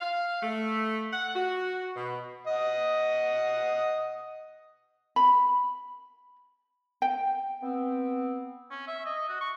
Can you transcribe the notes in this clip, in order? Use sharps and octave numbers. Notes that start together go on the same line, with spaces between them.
F5
A3
F#5
F#4
B2
D#5 F#5 D#6
B5
G5
B3 C4
C#4
E5
D#5
F#4
C#6